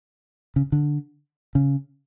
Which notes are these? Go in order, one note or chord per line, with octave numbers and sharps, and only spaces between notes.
C#3
D3
C#3